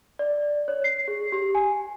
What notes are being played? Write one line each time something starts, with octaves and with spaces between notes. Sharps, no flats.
D5
C#5
C7
G#4
G4
G#5